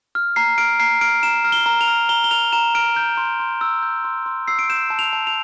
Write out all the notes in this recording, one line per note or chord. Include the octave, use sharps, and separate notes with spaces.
F6
A#5 C7
F6 D7
A#5 C7
F6 D7
A#5 E7
F6
G7
A#5
F7
F6
A#5 G7
G7
F6 F7
A#5 E7
F6 D7
G6
C6
C6
E6
G6
C6
C6
E6 C7
D7
G6 E7
A5
F7
A5
F7